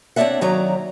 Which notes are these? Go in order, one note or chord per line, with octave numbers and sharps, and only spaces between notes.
C4 D4 C#5 D5 E5 F#5
F#2 D#3 F#3 C#5 D5 A#5